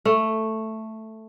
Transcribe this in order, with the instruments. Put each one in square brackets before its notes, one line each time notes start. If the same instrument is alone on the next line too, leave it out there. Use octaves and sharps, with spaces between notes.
[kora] A3